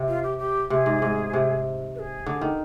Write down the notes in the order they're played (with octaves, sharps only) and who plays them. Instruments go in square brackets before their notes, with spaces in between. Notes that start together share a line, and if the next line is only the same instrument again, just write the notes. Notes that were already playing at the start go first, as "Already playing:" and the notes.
Already playing: [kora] C3
[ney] F4
G4
G4
[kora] C3 [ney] G#4
[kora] G#2
G#2
C3
[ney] B4
G#4
[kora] D3
D#3